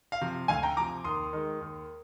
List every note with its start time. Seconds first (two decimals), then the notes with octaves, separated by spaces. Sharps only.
0.12 F5
0.21 C3 F3
0.48 D2 F5 G#5
0.63 G5 A#5
0.77 C3 F3 A#5 D6
1.04 D#2 C6 D#6
1.33 D#3 G#3
1.61 D#2